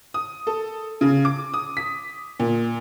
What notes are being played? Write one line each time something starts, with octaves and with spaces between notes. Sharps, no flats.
D#6
A4
C#3
D6
D#6
B6
A#2